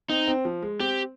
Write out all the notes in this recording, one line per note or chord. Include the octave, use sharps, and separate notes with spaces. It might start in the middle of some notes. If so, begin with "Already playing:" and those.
C4 D#4
C4
F3
G#3
C4 G4